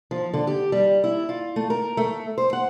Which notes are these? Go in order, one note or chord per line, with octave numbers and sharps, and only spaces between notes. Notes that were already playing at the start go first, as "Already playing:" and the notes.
F3
D3
G4
G3
E4
F4
A3
A#4
A3
C5
F#5